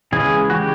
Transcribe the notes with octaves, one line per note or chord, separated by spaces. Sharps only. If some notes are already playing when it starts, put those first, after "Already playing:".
C#3 E3 G#3 C#4 G#4
F#4
G4